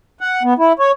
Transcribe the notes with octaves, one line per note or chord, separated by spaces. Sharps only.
F#5
B3
E4
C#5